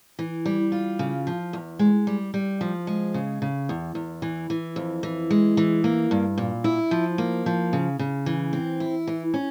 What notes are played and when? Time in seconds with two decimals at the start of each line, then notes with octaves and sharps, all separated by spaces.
0.19 E3
0.46 G3
0.72 F4
0.99 C#3
1.27 F3
1.53 E2
1.79 G#3
2.07 G3
2.34 G3
2.61 F3
2.87 G#3
3.14 C#3
3.42 C#3
3.69 E2
3.95 E2
4.22 E3
4.50 E3
4.76 F2
5.03 E3
5.31 G#3
5.57 E3
5.84 A#3
6.11 G2
6.38 A#2
6.64 E4
6.91 F3
7.18 A#3
7.46 F3
7.73 C#3
7.99 C#3
8.26 E3
8.53 C4
8.80 E4
9.07 E3
9.34 C#4